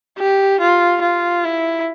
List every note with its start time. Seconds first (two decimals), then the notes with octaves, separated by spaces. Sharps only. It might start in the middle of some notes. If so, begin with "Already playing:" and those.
0.18 G4
0.61 F4
1.02 F4
1.44 E4